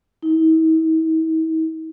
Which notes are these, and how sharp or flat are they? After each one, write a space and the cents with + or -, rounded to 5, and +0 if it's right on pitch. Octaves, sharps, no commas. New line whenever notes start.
E4 -45